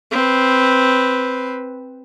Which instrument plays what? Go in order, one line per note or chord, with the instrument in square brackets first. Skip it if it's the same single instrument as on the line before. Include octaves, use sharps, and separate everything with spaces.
[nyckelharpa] C4 B4